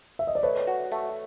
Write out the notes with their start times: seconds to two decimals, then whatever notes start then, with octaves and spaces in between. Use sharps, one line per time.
0.19 E5
0.27 D#5
0.35 D5
0.43 A3 B4 C#5
0.67 F#4
0.92 A3